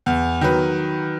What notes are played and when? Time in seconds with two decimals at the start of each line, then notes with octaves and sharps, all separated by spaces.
0.06 E2
0.41 D#3 F#3 B4